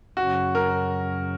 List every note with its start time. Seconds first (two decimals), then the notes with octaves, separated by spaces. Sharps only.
0.17 F#2 C#3 F#3 C#4 F#4
0.55 A#4